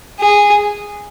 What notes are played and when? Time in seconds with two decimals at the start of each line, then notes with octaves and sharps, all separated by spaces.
0.20 G#4